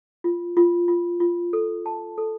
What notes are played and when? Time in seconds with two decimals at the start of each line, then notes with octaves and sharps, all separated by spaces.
0.24 F4
0.57 F4
0.88 F4
1.20 F4
1.53 A4
1.86 A5
2.18 A4